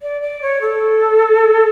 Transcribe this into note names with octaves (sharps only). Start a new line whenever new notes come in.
D5
D5
C#5
A4